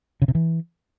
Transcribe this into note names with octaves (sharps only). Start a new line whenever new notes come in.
C#3
C3
E3